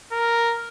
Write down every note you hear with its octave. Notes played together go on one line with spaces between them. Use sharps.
A#4